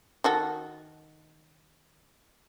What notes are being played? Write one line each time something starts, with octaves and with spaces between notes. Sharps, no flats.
D#3 F#4 A4